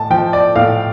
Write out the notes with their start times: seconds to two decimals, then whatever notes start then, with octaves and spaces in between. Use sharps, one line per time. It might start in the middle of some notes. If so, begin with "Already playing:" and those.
Already playing: A2 A5
0.10 F3 G5
0.33 D5
0.56 A2 F5